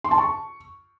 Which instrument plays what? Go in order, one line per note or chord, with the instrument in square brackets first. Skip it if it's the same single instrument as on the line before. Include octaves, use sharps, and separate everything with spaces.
[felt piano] C6
A5
C#6